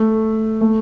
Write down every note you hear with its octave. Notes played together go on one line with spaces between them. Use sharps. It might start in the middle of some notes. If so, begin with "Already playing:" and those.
Already playing: A3
A3